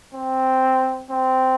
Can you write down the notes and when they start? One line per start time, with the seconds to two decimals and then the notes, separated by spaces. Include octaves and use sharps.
0.15 C4
1.10 C4